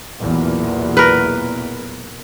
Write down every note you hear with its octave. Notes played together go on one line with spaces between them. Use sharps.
B1 E2 A#2
A#4 B4